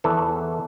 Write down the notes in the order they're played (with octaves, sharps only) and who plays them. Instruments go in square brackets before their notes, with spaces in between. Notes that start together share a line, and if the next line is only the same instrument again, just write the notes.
[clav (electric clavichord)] E2 E3 A4